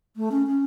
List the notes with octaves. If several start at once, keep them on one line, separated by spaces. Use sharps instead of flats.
A3
C#4
C#4